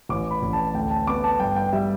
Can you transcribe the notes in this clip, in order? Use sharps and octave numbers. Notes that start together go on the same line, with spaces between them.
A1 D6
B5
A1
A5
D2 G5
A5
B3 D6
A5
G2 G5
G5
G3 E5